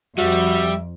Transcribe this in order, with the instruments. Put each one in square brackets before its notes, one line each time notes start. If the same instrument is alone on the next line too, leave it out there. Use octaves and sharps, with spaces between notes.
[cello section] F2 [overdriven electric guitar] G3 [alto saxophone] F#4 [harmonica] E5